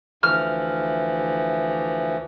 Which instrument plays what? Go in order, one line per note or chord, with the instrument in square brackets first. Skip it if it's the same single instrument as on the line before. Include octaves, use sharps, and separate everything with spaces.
[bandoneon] D2 E3 F3 [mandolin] F6